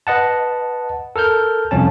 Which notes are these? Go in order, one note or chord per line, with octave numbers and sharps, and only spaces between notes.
B4 D#5 F#5 A5
A4 A#4 F6 G6
C2 F2 C#4 A5